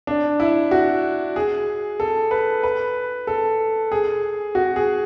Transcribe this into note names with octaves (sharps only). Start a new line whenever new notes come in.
D4
E4
F#4
G#4
A4
B4
B4
A4
G#4
F#4
G#4